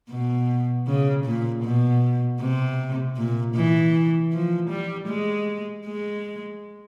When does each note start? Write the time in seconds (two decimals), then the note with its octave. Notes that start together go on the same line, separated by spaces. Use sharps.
0.10 B2
0.87 C#3
1.25 A#2
1.64 B2
2.41 C3
3.17 A#2
3.55 E3
4.33 F3
4.70 G3
5.08 G#3
5.86 G#3